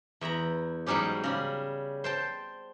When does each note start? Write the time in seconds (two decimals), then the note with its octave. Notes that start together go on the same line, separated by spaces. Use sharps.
0.21 E2 E5 A#5 B5
0.86 G#2 F#3 G3 C#4 G4
1.24 C#3 G3 B5
2.04 C5 G5 A5